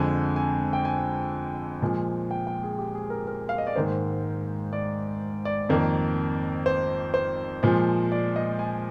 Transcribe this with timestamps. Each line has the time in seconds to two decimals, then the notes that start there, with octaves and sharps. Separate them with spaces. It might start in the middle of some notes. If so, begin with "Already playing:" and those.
Already playing: F2 D3 G#3 G#5
0.36 G#5
0.73 G5
0.85 G#5
1.82 A#2 F3 G#3
2.31 G5
2.47 G5
2.63 G#4
2.79 G4
2.95 G#4
3.10 A#4
3.27 A#4
3.49 F5
3.58 D#5
3.67 D5
3.76 G#2 D#3 A#3 C5
4.73 D5
5.45 D5
5.69 F2 D#3 A#3
6.66 C5
7.14 C5
7.63 A#2 F3 G#3
8.12 D5
8.36 D#5
8.59 G#5